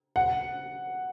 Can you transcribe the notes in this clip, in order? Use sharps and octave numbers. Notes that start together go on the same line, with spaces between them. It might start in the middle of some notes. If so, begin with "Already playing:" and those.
F#5